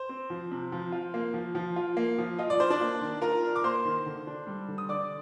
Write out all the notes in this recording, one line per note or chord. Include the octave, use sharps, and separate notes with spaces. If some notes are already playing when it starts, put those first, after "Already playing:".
Already playing: C5
C4
F3
C3
F3
F4
A#3
F3
F3
F4
A#3
F3
F4 D#5
D5
D4 C5
D4 D5
A#3
D#3
F4 A#4 A#5
D4
D6
A#3 C5 C6
D#3
D3
D4
G3
D3
D#6
D3 D5 D6